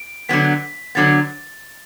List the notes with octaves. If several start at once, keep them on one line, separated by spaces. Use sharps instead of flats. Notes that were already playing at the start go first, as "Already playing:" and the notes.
Already playing: D7
D3 F#3 B3 B6
D3 F#3 B3 A6